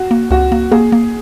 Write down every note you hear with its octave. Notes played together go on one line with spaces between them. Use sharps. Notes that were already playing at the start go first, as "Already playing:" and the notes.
Already playing: F#4
A#3
C#2 F#4
A#3
A#3 G#4
A#3